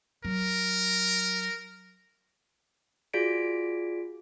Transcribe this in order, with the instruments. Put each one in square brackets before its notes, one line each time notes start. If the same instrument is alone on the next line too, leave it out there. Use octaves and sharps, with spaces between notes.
[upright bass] F#3 [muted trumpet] A#4
[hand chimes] F4 F#4 G#4 D5 B6 D7